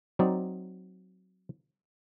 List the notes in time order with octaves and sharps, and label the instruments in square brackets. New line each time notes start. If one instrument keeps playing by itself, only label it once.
[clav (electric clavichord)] F#3 C4 D#4 D5